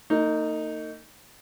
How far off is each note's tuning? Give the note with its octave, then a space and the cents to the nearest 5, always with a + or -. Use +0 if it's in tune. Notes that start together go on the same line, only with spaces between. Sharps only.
A#3 -45 D#4 +0